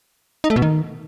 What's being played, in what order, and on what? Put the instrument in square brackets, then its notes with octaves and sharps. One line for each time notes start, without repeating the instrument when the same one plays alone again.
[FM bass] D#4
A3
B2
D#3